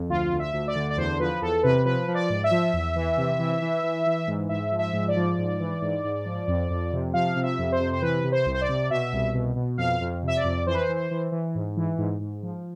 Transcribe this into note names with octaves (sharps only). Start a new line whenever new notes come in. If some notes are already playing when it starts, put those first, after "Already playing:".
Already playing: F2
D2 F4
D2
E5
D2
D5
D3
D5
E2 C5
F3 B4
E2 A4
C3 B4
F3 B4
F3
D5
G#2
E5
F3
E2
E3
C3
E3
E3
E3
E3
G#2
G#2 E5
F3
E5
G#2
D5
F3
G#2
E3
G#2
G#2
F3
F2
F2
C3
F3 F5
C3
E5
F2
C5
C3
C5
E3 B4
C3
C5
C2
C5
D5
C3
B2 E5
C2
B2
B2
F2 F5
F2
C3 E5
D5
F2
E3 C5
B4
C5
E3
C5
E3
E3
G#2
E3
G#2
G#2
F3